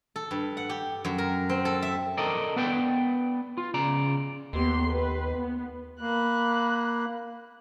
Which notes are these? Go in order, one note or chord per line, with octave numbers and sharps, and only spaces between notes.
A4
G2
F#5
G4
F#2
A#4
C4
A4
E5
A4 A#4 D5 D#5
B3 B4 D5 G5
F4
C#3 D5 A#5
D#2 B3 G4 C6
B4
B3
A#3 B5 F#6